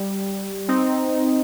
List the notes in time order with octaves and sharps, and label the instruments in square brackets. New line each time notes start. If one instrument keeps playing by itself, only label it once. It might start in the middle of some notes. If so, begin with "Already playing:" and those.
Already playing: [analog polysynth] G3
C4 D#4